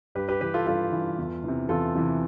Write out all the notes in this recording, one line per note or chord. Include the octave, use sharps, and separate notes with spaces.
G2 G4 B4
G4 B4
E3 G4 B4
F4 A4
G2 F4 A4
E3
E2
C3 E3
E2 F4 A4
C3 E3